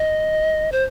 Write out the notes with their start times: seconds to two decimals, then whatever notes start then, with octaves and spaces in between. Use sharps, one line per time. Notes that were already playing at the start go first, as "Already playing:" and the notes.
Already playing: D#5
0.72 C5